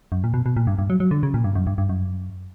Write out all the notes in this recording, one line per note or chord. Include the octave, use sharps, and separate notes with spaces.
F#2
A#2
B2
B2
A#2
G2
G2
F#3
F#3
D3
C#3
A#2
G2
F#2
G2
G2
F#2